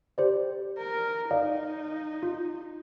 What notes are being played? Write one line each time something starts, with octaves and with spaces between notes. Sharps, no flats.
G4 C5 D5
A#4
D#4 D5 D#5 F5
F4